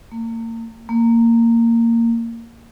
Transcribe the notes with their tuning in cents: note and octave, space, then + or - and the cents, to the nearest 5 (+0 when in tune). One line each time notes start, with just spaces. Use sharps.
A#3 -35
A#3 -15